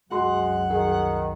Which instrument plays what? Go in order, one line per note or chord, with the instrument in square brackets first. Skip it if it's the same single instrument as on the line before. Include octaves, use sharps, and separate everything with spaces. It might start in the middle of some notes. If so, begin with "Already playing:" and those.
[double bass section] C2 F#2 [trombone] G#3 [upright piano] F#4 C6 [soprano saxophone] F#5
[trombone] D#3 [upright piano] G#4